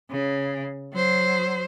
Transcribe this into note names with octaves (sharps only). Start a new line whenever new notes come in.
C#3
F#3 C5